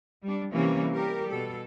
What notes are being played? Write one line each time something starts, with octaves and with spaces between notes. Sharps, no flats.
G3 D4
C3 E3 G3 A#3 C#4
G3 G4 A#4
B2 A4